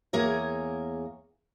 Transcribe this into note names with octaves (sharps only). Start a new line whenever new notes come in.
E2 A#3 G#4 A#4 C#5